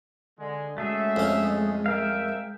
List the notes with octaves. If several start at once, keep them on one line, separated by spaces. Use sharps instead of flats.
D3 G#3
C#3 G#3 A3 F#4 G#4 E5
F2 C#4
A#4 E5 F5 G5